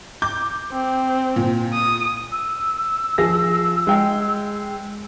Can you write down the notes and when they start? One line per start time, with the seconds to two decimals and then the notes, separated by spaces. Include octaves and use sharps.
0.22 D6 G6
0.72 C4
1.36 A#2
1.74 D#6
2.31 E6
3.18 F3 G#4 A#6
3.87 G#3 G5